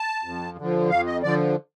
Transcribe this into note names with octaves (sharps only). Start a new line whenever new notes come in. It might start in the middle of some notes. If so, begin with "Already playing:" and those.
Already playing: A5
F2
D3 F3
F2 F5
D#5
D3 F3 D5